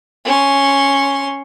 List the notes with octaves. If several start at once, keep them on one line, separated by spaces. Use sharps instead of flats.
C#4 C6